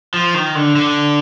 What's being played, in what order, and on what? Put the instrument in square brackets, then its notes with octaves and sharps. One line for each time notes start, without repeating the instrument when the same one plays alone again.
[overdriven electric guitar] F3
D#3
D3
D3